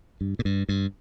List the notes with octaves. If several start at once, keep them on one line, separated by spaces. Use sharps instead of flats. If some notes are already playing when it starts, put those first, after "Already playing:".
G2
A#2
G2
G2